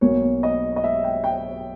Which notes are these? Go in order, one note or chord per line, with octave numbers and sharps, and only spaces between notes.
B1 B2 A#3 C#5
D#5
D#5
E5
G5
G5